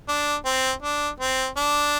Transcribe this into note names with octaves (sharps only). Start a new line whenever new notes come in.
D4
C4
D4
C4
D4